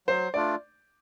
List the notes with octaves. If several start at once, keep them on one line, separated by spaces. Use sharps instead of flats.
F#3 C5
A3 D4 F4 D5